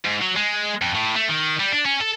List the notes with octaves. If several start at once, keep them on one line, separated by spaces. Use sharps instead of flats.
G#2
F#3
G#3
F2
A2
A3
D#3
G3
D4
C#4
A4